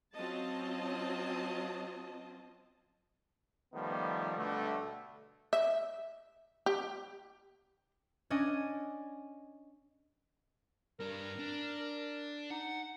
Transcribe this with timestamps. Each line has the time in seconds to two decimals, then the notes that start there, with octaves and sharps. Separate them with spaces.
0.14 F#3 C4 C#4 F4 D#5 A5
3.74 D#3 F3 G3 A3 B3
4.37 B2 D3 G3 A3
5.53 E5
6.66 G4
8.30 C#4 D4 D#5 G#5
11.00 G2 D4 A#4
11.39 D4
12.50 D#4 F#5